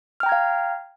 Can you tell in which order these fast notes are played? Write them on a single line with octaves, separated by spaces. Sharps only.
F6 G5 A#5 G#6 F5